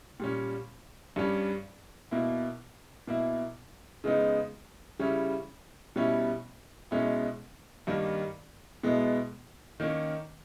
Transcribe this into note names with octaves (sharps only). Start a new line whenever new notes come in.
A#2 G3 C#4
G2 G3 C#4
B2 A#3 E4
B2 A#3 E4
C#3 G#3 B3 D#4
C#3 G3 C#4 E4
B2 G3 C#4 E4
B2 G#3 C#4 E4
G2 D#3 G3 A#3
B2 G#3 B3 E4
D#3 A#3 C#4